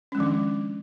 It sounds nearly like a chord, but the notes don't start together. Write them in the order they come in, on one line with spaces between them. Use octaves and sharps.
C#4 G#3 F3 D#3 D4